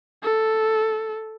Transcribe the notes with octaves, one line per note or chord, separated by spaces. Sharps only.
A4